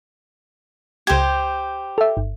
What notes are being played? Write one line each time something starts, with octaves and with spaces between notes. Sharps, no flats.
C#2 G4 C5 G#6
A4 E5
G1